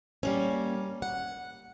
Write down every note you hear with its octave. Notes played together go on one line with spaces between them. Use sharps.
G3 A#3 C#4
F#5